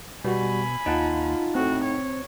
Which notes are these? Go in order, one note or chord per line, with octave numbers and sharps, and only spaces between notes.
B2 G3 F#4 G#5 B5
D#2 D#4 F4 F#5 A5
A2 C4 F#4
C#5